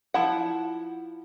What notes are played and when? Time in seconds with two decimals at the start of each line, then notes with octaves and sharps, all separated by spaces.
0.14 F3 E4 F#5